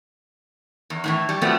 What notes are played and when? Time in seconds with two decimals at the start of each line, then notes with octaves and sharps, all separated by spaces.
0.90 E2
1.04 A2 D#3 E3
1.29 G3
1.41 B2 F3 G3 A3 B3 C4